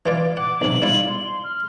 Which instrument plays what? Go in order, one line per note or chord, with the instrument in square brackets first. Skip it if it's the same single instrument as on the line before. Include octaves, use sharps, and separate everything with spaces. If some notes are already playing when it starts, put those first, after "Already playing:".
[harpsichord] E3 F4 D5
[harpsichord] F#5 [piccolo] D6
[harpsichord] B1 C3 [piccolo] F#7
[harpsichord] G3 E4 F4
[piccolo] C6
F6